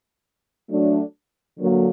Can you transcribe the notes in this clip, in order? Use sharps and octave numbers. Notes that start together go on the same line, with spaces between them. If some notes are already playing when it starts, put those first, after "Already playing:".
F#3 A3 D4
D3 F#3 A#3